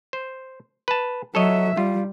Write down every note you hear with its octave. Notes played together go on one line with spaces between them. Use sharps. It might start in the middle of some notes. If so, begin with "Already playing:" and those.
C5
B4 A5
F#3 A4 C#5 D#5 E5
G3 F4